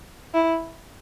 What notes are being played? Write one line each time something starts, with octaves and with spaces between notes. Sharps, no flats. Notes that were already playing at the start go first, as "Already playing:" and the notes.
E4